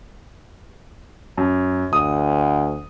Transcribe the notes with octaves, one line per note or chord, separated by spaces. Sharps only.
F#2
D2 D#6